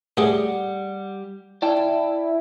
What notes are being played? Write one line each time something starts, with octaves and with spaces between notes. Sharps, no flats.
A2 G3 G4 G#4 F#5
E4 D5 G5 A5